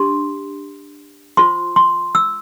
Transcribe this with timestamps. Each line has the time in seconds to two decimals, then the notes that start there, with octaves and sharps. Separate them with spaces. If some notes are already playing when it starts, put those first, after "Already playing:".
Already playing: D4 G4 C6
1.37 F4 C5 C6
1.76 C6
2.15 E6